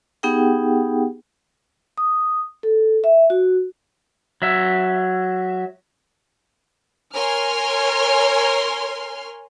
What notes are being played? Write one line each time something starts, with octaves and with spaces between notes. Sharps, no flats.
B3 D#4 G4 G#4 F#5 G5
D#6
A4
E5
F#4
F#3 E5
A#4 C#5 G#5 C6 F6